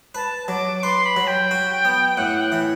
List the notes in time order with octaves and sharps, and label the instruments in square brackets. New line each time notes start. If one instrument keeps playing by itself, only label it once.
[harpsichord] B4 [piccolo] A5
[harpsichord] F#3 [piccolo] D6
[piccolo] D6
[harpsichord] B4 [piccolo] C6
[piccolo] B5
[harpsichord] F#3
[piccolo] G5
[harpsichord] F#4
B3
[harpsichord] A2 [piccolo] F#5
[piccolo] G5
[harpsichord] E3